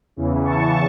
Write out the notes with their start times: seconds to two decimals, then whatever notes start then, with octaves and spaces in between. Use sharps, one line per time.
0.16 E2 C#3 E3
0.45 A5 C#6